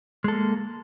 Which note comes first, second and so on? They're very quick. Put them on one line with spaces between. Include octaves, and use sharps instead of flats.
G#3 A4 A#3